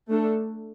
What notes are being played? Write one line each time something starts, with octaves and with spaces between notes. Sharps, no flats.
A3 D4 A4